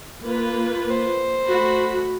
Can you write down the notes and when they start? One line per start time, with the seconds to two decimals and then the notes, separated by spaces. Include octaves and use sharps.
0.23 A#3 F4 B4
0.90 C5
1.47 A3 F#4 B5